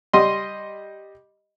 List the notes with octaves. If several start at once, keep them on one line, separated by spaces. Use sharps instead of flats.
G3 D#5 C6